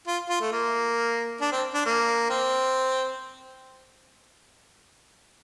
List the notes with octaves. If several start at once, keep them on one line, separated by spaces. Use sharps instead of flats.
F4
F4
A3
A#3
D4
C4
D4
A#3
C4